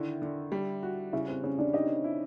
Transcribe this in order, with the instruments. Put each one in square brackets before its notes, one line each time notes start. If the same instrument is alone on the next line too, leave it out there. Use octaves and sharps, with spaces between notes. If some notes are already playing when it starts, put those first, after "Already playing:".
Already playing: [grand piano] D3 D#3 [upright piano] E4 E5
[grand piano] D3
G3
F#4
[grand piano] C#3 [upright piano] E4 E5
[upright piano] C4 C5
[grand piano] C#3 [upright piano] C#4 C#5
[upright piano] D4 D5
[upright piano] D#4 D#5 [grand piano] G4
[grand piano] E4